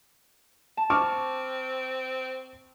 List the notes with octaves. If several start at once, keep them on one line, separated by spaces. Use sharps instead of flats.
A5
C4 C#6 D6 F6